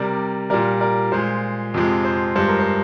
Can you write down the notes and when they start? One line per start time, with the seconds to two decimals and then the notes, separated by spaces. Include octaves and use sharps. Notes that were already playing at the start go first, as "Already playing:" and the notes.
Already playing: C3 G3 A#4 D5
0.50 A#2 G3 A#4 D5
0.81 A#4 D5
1.12 A#2 G#3 C5
1.74 F2 C3 F3 G#3
2.05 C5
2.36 G2 F3 G#3 C5
2.48 A#4
2.60 C5